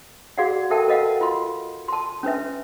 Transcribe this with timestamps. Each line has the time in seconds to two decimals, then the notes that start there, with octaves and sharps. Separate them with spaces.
0.38 F#4 G#4 D5 F5 F#5
0.70 A4 A#4 E5 G5 A5
0.88 A#4 B4 D#5 F5 F#5
1.21 F4 C6
1.88 A5 C6
2.23 C#4 D4 B4 E5